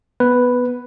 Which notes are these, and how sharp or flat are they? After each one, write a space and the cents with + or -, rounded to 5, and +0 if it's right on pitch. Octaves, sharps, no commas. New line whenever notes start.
B3 +0 B4 +0